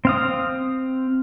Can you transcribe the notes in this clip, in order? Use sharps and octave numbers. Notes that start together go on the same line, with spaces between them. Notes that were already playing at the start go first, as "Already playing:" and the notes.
C4 F5 D#6